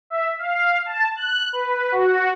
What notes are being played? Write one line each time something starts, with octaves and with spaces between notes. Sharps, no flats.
E5
F5
A5
F#6
B4
F#4